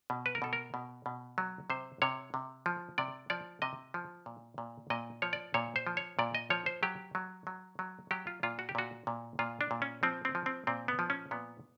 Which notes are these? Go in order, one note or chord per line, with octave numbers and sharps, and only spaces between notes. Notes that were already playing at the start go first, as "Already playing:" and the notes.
B2
B4
A#4
B2 A4
A#4
B2
B2
F#3
C3 C5
C3 C#5
C3
F3
C3 D5
F3 D5
C3 D#5
F3
A#2
A#2
A#2 D#5
F3 C#5
D5
A#2 C#5
C5
F3
C#5
A#2 D5
D#5
F3 C#5
C5
F#3 G4
F#3
F#3
F#3
F#3 G4
F4
A#2 F4
F#4
G4
A#2 F#4
A#2
A#2 F4
D4
A#2
C#4
F3 C4
C4
F3
C4
A#2 C4
B3
F3
C#4
A#2 B3